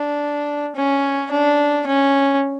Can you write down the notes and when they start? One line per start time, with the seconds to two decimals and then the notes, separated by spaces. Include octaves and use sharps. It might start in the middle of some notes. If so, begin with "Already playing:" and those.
Already playing: D4
0.76 C#4
1.32 D4
1.87 C#4